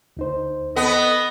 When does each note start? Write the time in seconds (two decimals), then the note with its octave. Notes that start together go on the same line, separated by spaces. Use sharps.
0.17 D2 D#4 C5
0.76 B3 A4 D#5